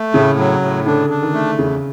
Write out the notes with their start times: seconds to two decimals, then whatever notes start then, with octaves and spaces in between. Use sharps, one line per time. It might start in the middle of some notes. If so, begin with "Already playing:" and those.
Already playing: A3
0.14 A2 C#3
0.39 F#3
0.63 A2
0.86 D3 D4
1.10 D4
1.22 D#3
1.34 A3
1.58 E2 C#3